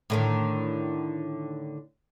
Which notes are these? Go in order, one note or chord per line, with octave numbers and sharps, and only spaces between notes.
A2 D3 D#3